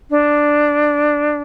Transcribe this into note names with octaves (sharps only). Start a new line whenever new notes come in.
D4